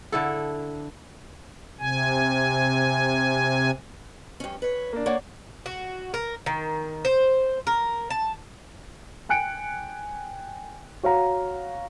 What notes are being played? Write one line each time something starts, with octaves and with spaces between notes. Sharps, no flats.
D3 E4 A4
C3 G#5
G2 C#4
B4 C#5
A#3 D4
A#3 C#5 D5 F#5
F#4
A#4
D#3
C5
A#4
A5
G5 G#5 F#6 C#7 D7
F#4 C#5 F5 A#5